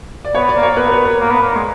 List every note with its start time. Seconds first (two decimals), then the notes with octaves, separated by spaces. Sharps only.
0.25 D5
0.35 B3 C#5
0.49 D5
0.56 A#3
0.63 C#5
0.77 B3 B4
0.87 A#4
0.92 B4
1.05 A#4
1.20 A#3
1.30 B3
1.42 A#3
1.55 G#3